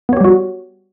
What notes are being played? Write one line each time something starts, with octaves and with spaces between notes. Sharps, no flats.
G3 B3 F#4 G4 C#5